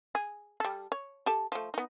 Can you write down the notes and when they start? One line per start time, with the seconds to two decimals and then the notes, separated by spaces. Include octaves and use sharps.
0.15 G#4
0.60 G3 A4
0.92 C#5
1.26 G4 A4 A5
1.52 F3 A3
1.74 B3 D#4